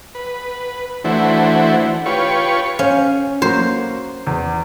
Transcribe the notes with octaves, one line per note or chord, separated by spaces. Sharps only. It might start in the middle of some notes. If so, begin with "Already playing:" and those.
B4
E3 A3 D4 E4 F#4 C5
F4 G4 B4 C#5 C#6
C#4 C5 F5
F#3 A#3 F#4 C5
E2